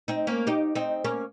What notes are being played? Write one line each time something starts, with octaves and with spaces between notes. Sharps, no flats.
C4 D#4
A#3 C#4
D#4 G4
C4 D#4
A#3 C#4